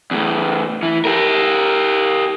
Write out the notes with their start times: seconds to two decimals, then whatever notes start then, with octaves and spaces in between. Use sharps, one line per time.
0.11 E2 A2
0.83 E3
1.05 G4 A#4